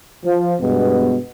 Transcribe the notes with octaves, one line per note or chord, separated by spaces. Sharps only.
F3
G2 B2 G#3 B3